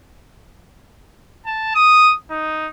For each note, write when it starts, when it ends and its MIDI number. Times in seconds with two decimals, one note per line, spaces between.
1.46 1.72 81
1.75 2.13 87
2.30 2.68 63